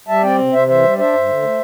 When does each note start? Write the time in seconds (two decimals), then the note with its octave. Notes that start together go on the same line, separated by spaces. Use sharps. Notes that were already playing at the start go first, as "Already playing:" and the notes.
0.08 G3 E5 A5
0.23 C4 D5 G5
0.38 C3
0.53 C3 C5 E5
0.67 E3 C5 E5
0.83 G3
0.98 D4 C5 E5
1.13 G2
1.28 D3
1.42 A3